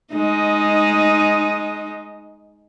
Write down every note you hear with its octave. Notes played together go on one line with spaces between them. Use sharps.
G#3 D#4